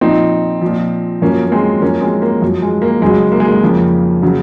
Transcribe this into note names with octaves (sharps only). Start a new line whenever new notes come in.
A#2 F3 C4 D#4
A#2 F3
F#2 F3 A#3 C#4
A#3
G#3 C4
F#2 F3 A#3 C#4
G#3 C4
A#3
F#2 F3
G#3
A#3
F#2 C#3 F#3 G#3
A#3
G#3
A#3
F2 C#3 F3
C#3 F#3